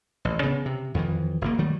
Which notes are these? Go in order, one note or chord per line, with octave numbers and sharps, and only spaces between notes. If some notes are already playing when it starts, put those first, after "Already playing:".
A1
C#3 B3
C3
F2 D#3 E3
F1 F#2 A#3
D#3 F#3 G3 A3